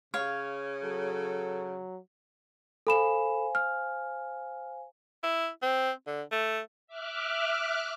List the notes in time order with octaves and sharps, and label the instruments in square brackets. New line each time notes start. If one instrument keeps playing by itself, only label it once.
[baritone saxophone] C#3 [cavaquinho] C#5 F5
[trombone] F#3 [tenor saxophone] A4
[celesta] A4 B5 E7 [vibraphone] C5 F5 G#5
[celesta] F6
[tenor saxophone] E4
C4
D3
A3
[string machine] E5 D6 F6 F#6